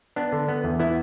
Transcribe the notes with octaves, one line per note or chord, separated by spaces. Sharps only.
B3 D4
D3
B3
E2
B3 E4